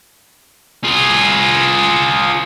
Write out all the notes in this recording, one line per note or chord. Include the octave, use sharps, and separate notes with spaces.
F4 G#4